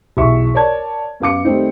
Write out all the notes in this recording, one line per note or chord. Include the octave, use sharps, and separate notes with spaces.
B1 E2 E5 C#6
A#4 C#5 D5 A5 G#6
F#2 B3 F5 D6 C#7
D#3 G3 A3 C4 D#4